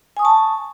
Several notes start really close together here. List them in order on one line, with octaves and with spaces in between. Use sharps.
G#5 D#6 C#6 A5